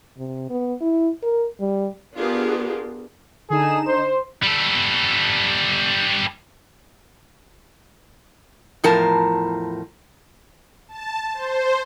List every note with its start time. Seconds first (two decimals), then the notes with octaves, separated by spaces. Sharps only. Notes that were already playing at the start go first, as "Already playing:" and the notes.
0.18 C3
0.50 B3
0.81 E4
1.23 A#4
1.60 G3
2.17 B3 D4 F4 G4 G#4 A#4
3.50 D3 D#4 G#4 A4 E7
3.87 C5
4.43 G3 A4
8.84 E2 A2 F3 A#4 A5
10.88 A5
11.34 C5